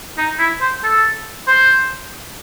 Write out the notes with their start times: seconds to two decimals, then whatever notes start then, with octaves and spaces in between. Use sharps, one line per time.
0.18 D#4
0.39 E4
0.61 C5
0.83 A4
1.47 C5